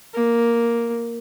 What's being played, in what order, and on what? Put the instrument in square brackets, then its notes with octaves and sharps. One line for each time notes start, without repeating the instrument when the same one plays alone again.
[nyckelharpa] A#3